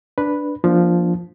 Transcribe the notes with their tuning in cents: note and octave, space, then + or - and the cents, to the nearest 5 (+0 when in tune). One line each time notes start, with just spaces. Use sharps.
D4 +0 B4 +0
F3 +0 A#3 +30 D4 +0